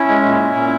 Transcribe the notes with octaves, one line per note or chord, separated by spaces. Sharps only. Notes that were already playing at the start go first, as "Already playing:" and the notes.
Already playing: C#4 E4
G#3
A#2
C#4
A#2